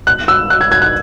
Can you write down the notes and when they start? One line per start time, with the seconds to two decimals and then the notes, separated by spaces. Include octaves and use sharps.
0.07 F#6
0.28 E6
0.50 F#6
0.61 G#6
0.72 G#6
0.82 F#6